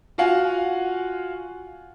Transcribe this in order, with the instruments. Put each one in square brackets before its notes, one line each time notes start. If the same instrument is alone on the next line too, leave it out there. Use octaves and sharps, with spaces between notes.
[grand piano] F4 F#4 F5 F#5 G#5